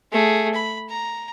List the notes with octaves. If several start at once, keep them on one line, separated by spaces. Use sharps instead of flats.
A3 G#4
B5
A#5